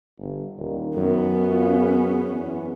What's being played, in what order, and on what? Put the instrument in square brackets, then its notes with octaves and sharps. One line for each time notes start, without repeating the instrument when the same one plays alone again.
[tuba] G1
[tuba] D#1 [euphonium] D#3
[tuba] F#2 [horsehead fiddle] B3 C#4
[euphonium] F4
G#4
E2